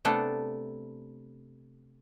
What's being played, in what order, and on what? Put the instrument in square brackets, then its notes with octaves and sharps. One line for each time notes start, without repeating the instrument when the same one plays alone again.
[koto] C3 A3 B3 D4 A4